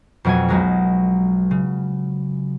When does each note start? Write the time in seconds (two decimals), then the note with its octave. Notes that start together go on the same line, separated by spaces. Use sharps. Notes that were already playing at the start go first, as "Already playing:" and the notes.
0.25 F2 B2 F#3 G#3 F#4 G#5
0.48 B1 F#3 G#3
1.51 C#3